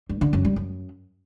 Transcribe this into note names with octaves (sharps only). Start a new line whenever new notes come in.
G2
D3
F#2
G3
F#2